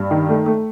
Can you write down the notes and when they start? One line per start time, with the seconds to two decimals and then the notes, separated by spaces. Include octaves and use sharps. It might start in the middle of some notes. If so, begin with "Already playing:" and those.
Already playing: G2
0.11 D#3
0.29 A3
0.46 A3